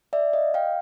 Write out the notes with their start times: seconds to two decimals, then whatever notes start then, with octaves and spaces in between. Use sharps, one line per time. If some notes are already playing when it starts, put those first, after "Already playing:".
0.13 D5 E5
0.33 D#5 F5
0.54 F5 G5